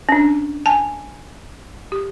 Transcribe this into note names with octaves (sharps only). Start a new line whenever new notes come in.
C#4 D4
G#5 A5
G4